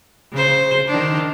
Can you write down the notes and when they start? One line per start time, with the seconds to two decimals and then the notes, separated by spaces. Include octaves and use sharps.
0.32 C#3 C5
0.88 D#3 D4